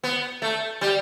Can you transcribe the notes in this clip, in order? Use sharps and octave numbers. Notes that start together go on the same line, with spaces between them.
B3
A3
G3